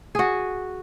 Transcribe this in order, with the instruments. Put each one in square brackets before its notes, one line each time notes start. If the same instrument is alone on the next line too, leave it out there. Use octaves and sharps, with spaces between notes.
[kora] F#4 G#4